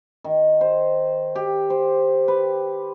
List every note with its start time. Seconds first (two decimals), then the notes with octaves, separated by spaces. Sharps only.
0.24 D#3
0.61 C5
1.35 G4
1.70 C5
2.28 B4